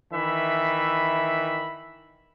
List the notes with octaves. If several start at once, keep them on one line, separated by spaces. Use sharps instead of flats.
D#3 E3 E5 B5